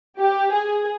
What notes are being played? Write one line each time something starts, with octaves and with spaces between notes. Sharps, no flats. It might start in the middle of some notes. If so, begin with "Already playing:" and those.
G4
G#4